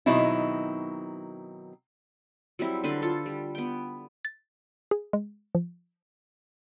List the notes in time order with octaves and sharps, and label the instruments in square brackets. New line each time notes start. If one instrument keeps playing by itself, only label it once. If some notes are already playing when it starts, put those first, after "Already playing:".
[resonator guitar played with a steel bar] B2 D#3 F#3 C4 D#4 E4
[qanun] F#3 G3 C4 E4
D3 D4 B4 C5
F4 A4
G3
B3 G5
[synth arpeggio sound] A6
G#4
G#3
F3